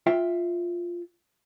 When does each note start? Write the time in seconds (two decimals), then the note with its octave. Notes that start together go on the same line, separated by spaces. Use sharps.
0.07 F4 E5 G5